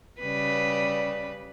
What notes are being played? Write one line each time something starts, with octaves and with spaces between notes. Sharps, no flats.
C#3 G3 B4